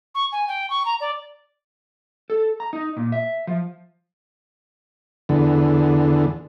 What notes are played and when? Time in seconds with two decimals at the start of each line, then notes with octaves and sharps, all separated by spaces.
0.15 C#6
0.32 G#5
0.48 G5
0.70 C#6
0.85 A#5
1.00 D5
2.30 A4
2.60 A#5
2.73 D#4
2.97 A#2
3.12 E5
3.47 F3
5.29 E2 D3